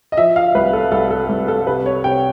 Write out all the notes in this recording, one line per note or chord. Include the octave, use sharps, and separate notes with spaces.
D#5
F3 E5
F5
C2 B4
A4
C2 A4
A4
C2
A4
C3 B4
C#5
C3 G5